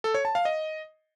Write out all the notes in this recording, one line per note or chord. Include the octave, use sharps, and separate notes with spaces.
A4
C#5
A5
F5
D#5